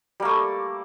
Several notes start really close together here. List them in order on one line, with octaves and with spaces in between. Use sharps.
G3 A#3 A3